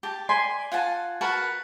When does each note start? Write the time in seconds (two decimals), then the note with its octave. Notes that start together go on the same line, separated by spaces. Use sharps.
0.03 G4 A5
0.29 D5 G#5 B5 C6
0.72 F4 F#5 G#5 A5
1.21 F#4 A#4 B4 A5